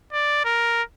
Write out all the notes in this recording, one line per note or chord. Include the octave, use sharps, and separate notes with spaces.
D5
A#4